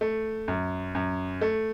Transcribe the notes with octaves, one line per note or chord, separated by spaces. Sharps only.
A3
F#2
F#2
A3